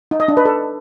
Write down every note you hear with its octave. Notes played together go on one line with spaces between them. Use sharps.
D#4
D#5
D4
B4
A4